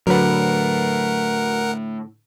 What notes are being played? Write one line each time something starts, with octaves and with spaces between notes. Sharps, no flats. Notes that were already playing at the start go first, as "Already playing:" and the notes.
A2 D3 F#3 A#4 B4 F#5